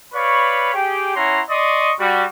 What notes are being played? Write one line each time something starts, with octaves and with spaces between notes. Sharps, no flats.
B4 C#5 D5 F5 B5 C#6
G4 G#4 G5
C#4 E4 C#5 F#5 A#5 C6
D5 D#5 C6 C#6 D#6
G3 F#4